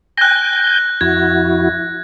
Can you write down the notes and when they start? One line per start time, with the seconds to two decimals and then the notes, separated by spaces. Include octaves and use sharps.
0.18 G5 G#5 F#6 G6 A#6
1.01 F2 E4 F#4 G#6